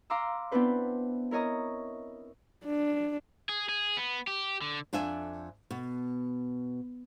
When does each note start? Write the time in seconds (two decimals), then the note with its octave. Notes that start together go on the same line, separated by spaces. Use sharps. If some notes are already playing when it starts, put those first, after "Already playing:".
0.10 F5 A#5 C6 D6 E6
0.51 B3 C4 D4 E4 B4 C5
1.31 E4 A#4 C#5 D#5 A#5
2.65 D4
3.49 G#4
3.69 G#4
3.97 B3
4.27 G4
4.62 D3
4.93 F2 D4 D5 E5 G#5
5.71 B2